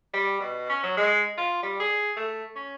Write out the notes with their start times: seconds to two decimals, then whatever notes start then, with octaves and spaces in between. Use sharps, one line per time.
0.13 G3
0.40 B2
0.69 C#4
0.83 F#3
0.97 G#3
1.38 F4
1.63 G3
1.80 G#4
2.17 A3
2.56 C#4